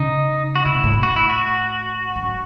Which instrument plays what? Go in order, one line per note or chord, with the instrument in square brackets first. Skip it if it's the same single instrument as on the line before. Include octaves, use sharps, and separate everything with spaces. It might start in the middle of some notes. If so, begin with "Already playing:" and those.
Already playing: [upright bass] C#3 [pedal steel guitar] D#4
[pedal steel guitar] F#4
[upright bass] C#3 [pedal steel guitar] E4
[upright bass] B2
A2
B2
[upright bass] A2 [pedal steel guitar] F#4
[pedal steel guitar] E4
F#4
[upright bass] F#2